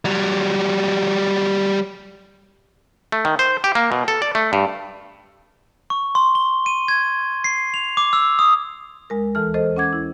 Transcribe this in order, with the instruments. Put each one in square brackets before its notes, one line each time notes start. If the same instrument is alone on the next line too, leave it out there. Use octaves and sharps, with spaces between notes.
[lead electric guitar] F#3 G3
[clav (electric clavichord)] A3
D#3
C5
G4
A#3
B2
A4
D5
A3
G2
[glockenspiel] C#6
C6
G7
D#7
G#6
C7
F7
D6
E6
D#6
[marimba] D2 G#3 A#4
D#2 E3 A4 A5 F6
A4 C5 D#5
C#4 F#5 D6 G#6
E4